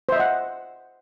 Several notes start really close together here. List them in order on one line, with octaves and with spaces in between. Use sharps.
C5 E5 D#5 F#5